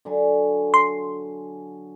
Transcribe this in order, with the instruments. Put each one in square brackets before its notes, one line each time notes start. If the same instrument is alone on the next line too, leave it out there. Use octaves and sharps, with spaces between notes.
[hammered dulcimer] D3 F#3 G#5
[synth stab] C6